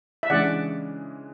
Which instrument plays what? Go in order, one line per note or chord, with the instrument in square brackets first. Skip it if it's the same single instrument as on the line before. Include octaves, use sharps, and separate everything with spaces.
[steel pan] E5
[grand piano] C#3 E3 G#3 D4 [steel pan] D5 F#5